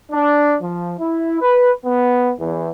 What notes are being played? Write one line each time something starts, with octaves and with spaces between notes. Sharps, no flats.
D4
F3
E4
B4
B3
E2